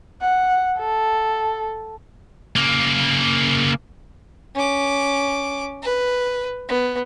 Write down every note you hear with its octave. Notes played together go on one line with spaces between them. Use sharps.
F#5
A4
C#3 A#3
C#4 D6
B4
B3